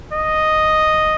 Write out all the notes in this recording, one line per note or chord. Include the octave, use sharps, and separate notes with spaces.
D#5